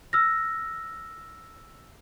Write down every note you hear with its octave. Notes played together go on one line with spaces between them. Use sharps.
E6 F6 A#6